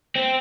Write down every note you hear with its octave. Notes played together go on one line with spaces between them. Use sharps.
C4